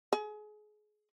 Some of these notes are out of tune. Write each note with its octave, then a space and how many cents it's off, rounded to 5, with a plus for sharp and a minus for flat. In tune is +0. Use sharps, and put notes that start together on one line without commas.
G#4 +30